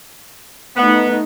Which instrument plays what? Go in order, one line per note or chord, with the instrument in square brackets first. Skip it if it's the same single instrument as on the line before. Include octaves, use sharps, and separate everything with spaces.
[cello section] A3 D#4 [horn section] B3